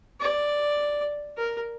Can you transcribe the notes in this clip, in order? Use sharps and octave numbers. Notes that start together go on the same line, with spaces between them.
D5
A#4